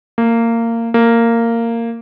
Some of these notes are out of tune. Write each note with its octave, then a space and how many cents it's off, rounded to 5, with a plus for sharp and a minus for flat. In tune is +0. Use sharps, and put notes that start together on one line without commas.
A#3 -20
A#3 -15